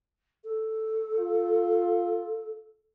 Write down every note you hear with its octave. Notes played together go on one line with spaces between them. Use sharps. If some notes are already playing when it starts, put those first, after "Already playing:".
A4
F4